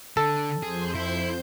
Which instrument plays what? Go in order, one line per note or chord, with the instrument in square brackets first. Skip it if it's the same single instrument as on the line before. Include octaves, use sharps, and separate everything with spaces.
[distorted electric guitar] D3 [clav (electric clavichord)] A4
[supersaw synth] F2 C5 G6 [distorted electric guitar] G#4
[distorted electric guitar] E4